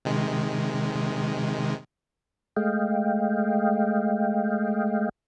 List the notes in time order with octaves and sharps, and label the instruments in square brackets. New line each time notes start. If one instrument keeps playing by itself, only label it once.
[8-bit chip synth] C3 D#3 G#3
[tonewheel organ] G#3 A3 D#5 F5 G5